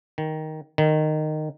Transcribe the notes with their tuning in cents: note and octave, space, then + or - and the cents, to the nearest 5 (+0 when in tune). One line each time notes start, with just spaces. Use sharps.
D#3 +5
D#3 -15